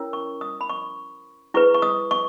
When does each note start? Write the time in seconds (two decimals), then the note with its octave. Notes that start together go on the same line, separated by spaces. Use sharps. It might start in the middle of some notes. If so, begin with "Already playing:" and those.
Already playing: C#4 E4 A#4 C#5
0.13 C#6
0.41 D#6
0.61 B5
0.70 C#6
1.54 E4 G#4 B4 C#6
1.74 C#6
1.82 D#6
2.11 C#6